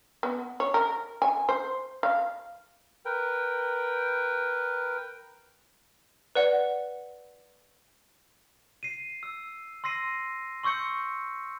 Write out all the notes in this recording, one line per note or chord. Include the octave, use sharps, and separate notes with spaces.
B3
C#5
A#4
G#5
C5
F5
A#4 B4 G5
B4 D5 F#5
C7 D#7
E6
C6 E6 A#6 C7 D#7
C6 C#6 E6 G6 C#7